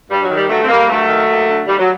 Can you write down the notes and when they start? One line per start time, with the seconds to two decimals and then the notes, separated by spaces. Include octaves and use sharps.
0.10 G2 G3
0.23 F#3
0.30 D#3
0.36 G3
0.49 G2 F#3 A3
0.62 C4
0.68 D#3 G3 A#3
0.89 G2 F#3 A3
1.08 D#3
1.28 D#2
1.48 D3
1.67 D#2 G3
1.79 F#3